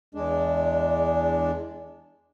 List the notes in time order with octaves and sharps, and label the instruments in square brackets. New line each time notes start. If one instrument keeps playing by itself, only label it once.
[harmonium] E2 G#3 D4